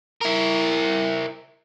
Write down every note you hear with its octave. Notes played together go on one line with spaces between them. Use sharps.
E4 A#4